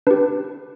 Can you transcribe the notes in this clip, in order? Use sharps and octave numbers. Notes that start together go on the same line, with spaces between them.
D4 G4 B4